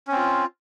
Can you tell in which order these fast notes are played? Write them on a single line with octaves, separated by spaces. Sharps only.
C#4 C4 F4